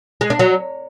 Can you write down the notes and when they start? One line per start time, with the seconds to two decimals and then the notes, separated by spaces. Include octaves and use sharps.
0.21 G#3
0.30 D4
0.39 F#3